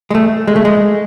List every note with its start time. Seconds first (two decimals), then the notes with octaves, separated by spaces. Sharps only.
0.10 G#3
0.15 A3
0.47 G#3
0.56 A3
0.65 G#3